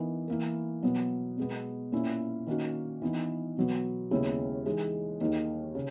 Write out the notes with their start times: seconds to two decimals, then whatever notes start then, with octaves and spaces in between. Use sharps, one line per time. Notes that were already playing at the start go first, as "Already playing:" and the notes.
Already playing: E3 B3 D#4 A#4
0.28 E3 A#3 E4 A#4
0.83 B2 F#3 B3
1.37 B2 G#3 B3
1.92 A#2 A#3 C#4 E4
2.47 D#3 A#3 C#4 F#4
3.02 E3 B3 D#4
3.57 B2 F#3 B3
4.11 D#2 C#3 G#3 B3 E4
4.66 E3 G#3 D#4 G#4
5.20 D#2 D#3 A#3 D#4 G#4
5.75 C#3